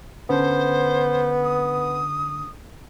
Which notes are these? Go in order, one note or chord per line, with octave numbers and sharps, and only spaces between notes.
D3 B3 C#4 C5
D#6